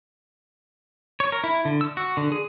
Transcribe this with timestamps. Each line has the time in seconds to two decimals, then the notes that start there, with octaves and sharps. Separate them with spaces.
1.20 C#5
1.32 A#4
1.44 E4
1.65 D3
1.81 E6
1.97 F#4
2.17 D3
2.32 G#4